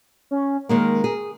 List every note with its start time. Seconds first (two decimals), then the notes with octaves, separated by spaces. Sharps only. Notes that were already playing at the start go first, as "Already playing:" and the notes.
0.31 C#4
0.69 D#3 G#3 A#3 A#4
1.04 G#4